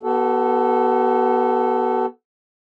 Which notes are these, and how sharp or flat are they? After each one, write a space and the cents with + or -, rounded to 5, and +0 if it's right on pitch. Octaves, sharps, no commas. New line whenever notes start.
B3 -20 F#4 +40 A4 +0